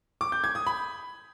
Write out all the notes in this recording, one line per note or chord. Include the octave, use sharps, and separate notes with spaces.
D6
G6
G#6
D#6
B5